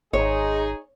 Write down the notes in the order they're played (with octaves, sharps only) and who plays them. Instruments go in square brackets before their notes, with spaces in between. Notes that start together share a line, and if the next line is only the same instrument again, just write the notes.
[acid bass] G#1 [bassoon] G#3 [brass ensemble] D#4 G#4 [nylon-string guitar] C#5